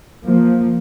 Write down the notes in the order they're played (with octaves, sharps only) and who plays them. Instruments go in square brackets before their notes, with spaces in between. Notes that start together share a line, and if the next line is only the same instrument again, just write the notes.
[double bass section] F3 A#3